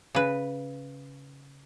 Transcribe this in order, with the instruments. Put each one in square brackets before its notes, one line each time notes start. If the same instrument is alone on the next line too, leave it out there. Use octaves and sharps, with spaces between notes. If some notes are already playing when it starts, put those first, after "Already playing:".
[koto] C#3 B4